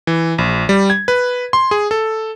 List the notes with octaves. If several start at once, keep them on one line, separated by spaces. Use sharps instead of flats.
E3
A#1
G3
G#6
B4
C6
G#4
A4